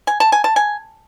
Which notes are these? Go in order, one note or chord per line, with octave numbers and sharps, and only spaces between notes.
G#5
A5
G#5
A5
G#5